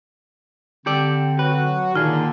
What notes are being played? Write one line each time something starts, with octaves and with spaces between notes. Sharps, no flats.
D3 C4 G4 A4 D5
F#3 F#4 B4
A#2 D3 D#3 G#4 F6